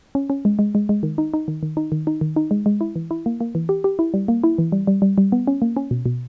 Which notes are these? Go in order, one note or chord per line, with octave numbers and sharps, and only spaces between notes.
C#4
C#4
G#3
G#3
G#3
G#3
D#3
D#4
D#4
D#3
D#3
D#4
D#3
D#4
D#3
D#4
G#3
G#3
E4
E3
E4
A#3
A#3
E3
G4
G4
E4
G3
A#3
E4
E3
G3
G3
G3
G3
B3
C#4
A#3
C#4
B2
B2